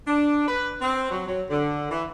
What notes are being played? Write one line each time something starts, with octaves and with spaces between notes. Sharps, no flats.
D4
B4
C4
F#3
F#3
D3
E3